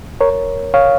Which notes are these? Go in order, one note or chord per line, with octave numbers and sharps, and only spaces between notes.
A#4 C#5
C#5 F5